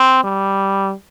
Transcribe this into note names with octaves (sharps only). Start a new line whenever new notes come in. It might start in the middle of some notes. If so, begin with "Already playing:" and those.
Already playing: C4
G3